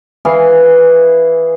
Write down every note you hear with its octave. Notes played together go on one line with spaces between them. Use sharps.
E3 G#4 F5